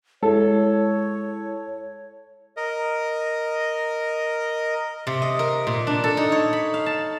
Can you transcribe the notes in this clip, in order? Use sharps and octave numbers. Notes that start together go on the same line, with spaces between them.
G#3 E4 A4 C#5
A#4 D#5
C3
D#5
A#4
A#2
D4
A4
D#4
C#5
B5
F5
A5